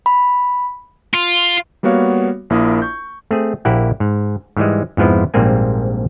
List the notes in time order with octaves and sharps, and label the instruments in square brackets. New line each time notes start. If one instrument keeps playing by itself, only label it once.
[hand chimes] B5
[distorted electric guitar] F4
[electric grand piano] G3 A#3 B3 F#4 C#5 F5
A#1 A#3 E4 A#4 D#6
C#6 G6
[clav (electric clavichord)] A3 C4 G#4
A#1 A#3 E4 G4 F#5
G#2
G#2 E3 G3 G#3
F2 G#2 F3 B3 E4
A#1 G#2 G3 A#3 C4 G#5